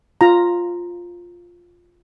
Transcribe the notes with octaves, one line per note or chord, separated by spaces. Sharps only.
F4 A#5